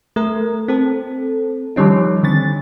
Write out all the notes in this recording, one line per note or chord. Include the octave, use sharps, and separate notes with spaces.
A3 A#4
C4 A4
D#3 F3 G3 C#4 D#4
D3 C4 A6